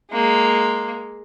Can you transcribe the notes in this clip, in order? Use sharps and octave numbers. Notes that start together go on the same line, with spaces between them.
G#3 A#3